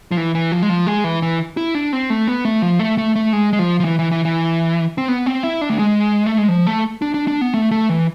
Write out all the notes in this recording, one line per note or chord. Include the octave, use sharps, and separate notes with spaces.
F3
E3
E3
F3
G#3
F3
G#3
E3
E3
E4
D4
C4
A3
B3
A3
F3
A3
A3
A3
G#3
G#3
F3
F3
E3
E3
E3
E3
C4
B3
C4
E4
D4
A3
G#3
A3
G#3
F3
A3
D4
D4
D4
B3
A3
A3
E3